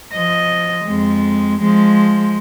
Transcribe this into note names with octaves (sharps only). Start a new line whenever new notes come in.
F3 D#5
F2 G#3
F3 G#3